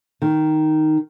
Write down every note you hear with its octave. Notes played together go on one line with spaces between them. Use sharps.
D#3